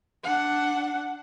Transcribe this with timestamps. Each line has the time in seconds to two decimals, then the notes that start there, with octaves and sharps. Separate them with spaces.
0.24 D4 F#5